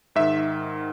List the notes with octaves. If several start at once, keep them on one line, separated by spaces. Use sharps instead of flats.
G#2 D#3 E5